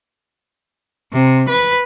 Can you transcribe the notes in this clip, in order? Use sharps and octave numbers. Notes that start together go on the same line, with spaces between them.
C3
B4